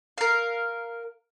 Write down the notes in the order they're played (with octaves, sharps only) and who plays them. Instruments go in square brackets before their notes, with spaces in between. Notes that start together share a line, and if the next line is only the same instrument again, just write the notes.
[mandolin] A#4 F5